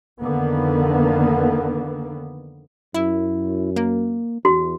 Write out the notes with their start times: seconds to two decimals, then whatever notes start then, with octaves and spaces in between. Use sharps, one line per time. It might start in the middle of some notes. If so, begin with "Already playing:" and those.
0.20 F2 D3 D#3 A#3 B3
2.94 F#2 E4
3.76 A#3
4.45 E2 F#4